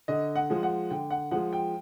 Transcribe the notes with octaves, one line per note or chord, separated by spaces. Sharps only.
D3 D#5
F#5
F3 G#3
F#5
D3 G5
F#5
F3 G#3 F#5
G5